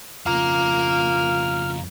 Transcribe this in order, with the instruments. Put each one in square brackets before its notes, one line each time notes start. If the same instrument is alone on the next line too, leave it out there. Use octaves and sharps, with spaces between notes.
[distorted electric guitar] F2 C#3 [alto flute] F4 [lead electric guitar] F5 A#5 [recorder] F6